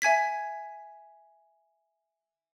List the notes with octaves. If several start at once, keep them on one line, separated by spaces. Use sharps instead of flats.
E5 G#5 G#6 B6